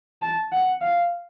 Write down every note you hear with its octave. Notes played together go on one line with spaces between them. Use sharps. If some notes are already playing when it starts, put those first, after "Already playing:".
A5
F#5
F5